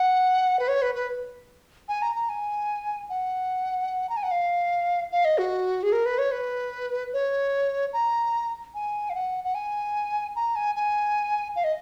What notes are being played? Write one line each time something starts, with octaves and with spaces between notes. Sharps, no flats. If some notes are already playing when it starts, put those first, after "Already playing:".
Already playing: F#5
B4
C#5
B4
B4
G#5
A#5
A#5
G#5
F#5
A#5
G#5
F#5
F5
F5
D#5
F#4
G#4
A#4
B4
C#5
B4
C#5
A#5
G#5
F5
F#5
F#5
G#5
A#5
G#5
G#5
F5
D#5